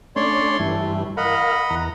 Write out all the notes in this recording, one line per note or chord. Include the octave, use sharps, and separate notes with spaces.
A3 C#4 D4 C#5 D5 C6
G2 E3 A3
A#4 D#5 F5 F#5 B5
E2 A#5